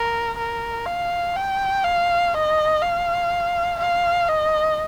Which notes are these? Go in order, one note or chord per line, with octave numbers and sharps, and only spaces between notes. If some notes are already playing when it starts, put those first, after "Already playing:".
Already playing: A#4
A#4
F5
G5
F5
D#5
F5
F5
D#5